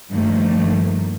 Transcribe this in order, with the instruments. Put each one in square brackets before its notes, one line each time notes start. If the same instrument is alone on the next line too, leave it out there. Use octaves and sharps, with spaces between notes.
[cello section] G2 D#3 F3 A3 A#3